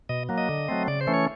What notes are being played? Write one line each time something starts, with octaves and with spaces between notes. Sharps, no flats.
B2 D#5
F#3 A#3
D#5
D3
F#3 A3 C4
C#3 D5
C5
E3 A3 C#4
C#5